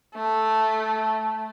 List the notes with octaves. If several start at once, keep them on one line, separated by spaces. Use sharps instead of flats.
A3